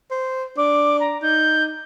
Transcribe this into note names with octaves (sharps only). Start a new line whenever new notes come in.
C5
D4 D6
A#5
D#4 G6